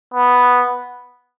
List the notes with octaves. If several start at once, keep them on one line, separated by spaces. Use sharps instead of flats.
B3